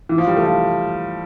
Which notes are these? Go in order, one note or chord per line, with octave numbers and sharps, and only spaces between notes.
E3
F3
G3
A3
F3